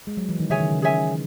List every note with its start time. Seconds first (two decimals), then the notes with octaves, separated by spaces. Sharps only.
0.07 G#3
0.17 F#3
0.29 E3
0.40 D#3
0.50 C#3 G#4 C#5 E5 G#5
0.60 D#3
0.72 C#3
0.82 G#4 C#5 E5 G#5